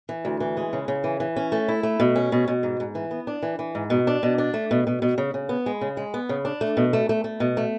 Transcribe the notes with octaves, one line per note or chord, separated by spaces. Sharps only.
E3
D2
E3
G#3
C#3
C#3
E3
E3
C#4
A3
E4
A3
B2
C#4
B2
B2
G#2
G#2
E3
B3
D4
E3
E3
G#2
B2
D4
B2
D4
A3
B2
B2
B2
C#3
C#3
B3
G#3
C#3
G#3
B3
C#3
D4
A3
B2
A3
A3
A3
B2
A3